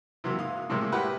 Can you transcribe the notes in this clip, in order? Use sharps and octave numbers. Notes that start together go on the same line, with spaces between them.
C3 E3 F#3 A#3
G#2 F5 D#6
A2 C3 G3 G#3 A#3
E4 G4 A#4 B4 F#5